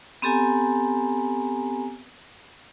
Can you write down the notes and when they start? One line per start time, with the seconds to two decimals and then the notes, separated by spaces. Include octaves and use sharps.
0.22 B3 C4 G4 A4 G#5 A#5